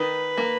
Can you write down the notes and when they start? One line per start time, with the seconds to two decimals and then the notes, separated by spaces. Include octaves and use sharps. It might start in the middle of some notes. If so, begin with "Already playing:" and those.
Already playing: D#3 B4
0.37 A#3